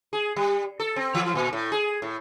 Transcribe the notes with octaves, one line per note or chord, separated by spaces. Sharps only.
G#4
G3
A4
C4
E3
A#2
A2
G#4
A2